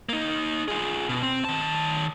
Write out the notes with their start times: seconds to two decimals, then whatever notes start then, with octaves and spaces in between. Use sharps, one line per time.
0.09 A#3 D#4
0.68 F4 G#4
1.09 B2
1.23 C4
1.45 D#3 A5